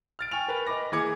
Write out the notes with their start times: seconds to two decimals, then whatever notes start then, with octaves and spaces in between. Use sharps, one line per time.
0.19 F6 A6 D7
0.31 G5 G#5 C#6 F6 F7
0.48 A#4 B4 F7
0.67 B4 D#5 B5 D6 A#6
0.92 E3 A#3 G#4 D6 G#6 C#7